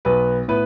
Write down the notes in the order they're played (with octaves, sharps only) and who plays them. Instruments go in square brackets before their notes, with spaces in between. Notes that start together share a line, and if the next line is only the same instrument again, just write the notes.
[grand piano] B1 B3 B4
A2 B3 B4